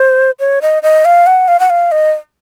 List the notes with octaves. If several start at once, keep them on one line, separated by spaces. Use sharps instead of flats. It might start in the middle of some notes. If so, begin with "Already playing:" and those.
Already playing: C5
C#5
D#5
D#5
F5
F#5
F5
F#5
F5
D#5